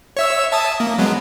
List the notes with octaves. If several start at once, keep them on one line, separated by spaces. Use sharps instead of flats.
C#5 E5 E6
E5 A5 D#6
A#3
F#3 G#3 B3